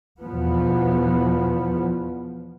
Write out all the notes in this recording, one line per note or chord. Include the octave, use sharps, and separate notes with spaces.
E2 B2 F3 B3